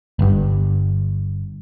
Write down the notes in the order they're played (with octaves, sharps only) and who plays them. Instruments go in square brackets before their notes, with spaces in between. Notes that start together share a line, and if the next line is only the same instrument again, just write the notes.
[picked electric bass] G1 G2